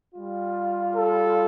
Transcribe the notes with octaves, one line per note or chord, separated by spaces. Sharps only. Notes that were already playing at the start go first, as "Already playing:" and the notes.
G3 F4
A4